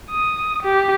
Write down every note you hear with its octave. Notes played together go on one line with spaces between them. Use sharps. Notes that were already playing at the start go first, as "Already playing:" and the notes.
D#6
G4